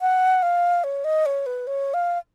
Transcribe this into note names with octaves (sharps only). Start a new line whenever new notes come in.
F#5
F5
C#5
D#5
C#5
B4
C#5
F5